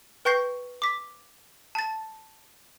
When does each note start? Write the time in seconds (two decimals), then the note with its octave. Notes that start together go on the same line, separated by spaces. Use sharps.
0.25 B4 G5 C#6 G6 A#6 C7
0.82 D6 B6
1.75 A5 A6